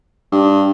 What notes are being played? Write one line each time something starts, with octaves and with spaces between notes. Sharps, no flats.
G2